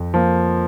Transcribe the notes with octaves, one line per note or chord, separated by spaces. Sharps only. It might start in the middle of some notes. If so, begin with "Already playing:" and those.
Already playing: F2
F3 A#3